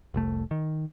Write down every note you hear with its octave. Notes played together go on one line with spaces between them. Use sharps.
F1 C2 A3
D#3